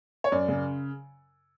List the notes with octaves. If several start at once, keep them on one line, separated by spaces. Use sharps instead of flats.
C#5
F#2 D5
C#3